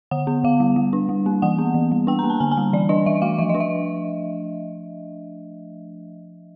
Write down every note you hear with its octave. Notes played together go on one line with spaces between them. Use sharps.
D3 F#5
B3
D3 F5
G3
G3
D4
G3
A#3
E3 F#5
B3
E3
G3
D4 G5
A#5
A#3
A5
D3 G#5
G#5
G3
E3 D5
D4 D#5
E3 E5
A3 F5
F3 E5
D#5
D4
E5